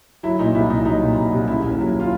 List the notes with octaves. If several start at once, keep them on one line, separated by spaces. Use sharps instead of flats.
F#3 E4
A#2 D#4
C2 E4
C2 D#4
F#3 D#4
A#2
C2
C2
C#3 E4
D#2
F#3
F4